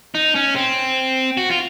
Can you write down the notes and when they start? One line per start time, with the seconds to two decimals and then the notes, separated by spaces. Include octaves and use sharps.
0.15 D#4
0.35 C#4
0.55 C4
1.37 F#4
1.51 F4